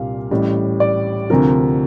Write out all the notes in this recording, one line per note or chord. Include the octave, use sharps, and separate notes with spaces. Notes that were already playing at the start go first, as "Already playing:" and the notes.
Already playing: C2 A#2 G3 F5
A1 A2 G3
D5
D2 C3 F3 A#4